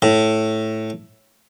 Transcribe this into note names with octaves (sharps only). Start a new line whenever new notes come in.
A2